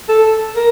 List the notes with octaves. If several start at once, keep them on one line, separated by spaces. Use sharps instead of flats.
A4
A#4